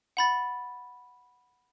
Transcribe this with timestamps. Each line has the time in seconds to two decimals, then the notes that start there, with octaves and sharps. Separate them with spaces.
0.17 F#5 B5 A6